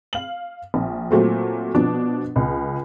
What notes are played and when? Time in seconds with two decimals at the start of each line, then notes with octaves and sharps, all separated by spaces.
0.13 F5 F#7
0.74 A#1
1.11 A#2 F#3 A3 C4
1.75 B2 F3 D4
2.36 C#2